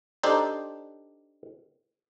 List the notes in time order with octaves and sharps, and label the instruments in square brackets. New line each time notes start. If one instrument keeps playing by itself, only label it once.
[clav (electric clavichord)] D4 D#4 G4 A4 C5 D5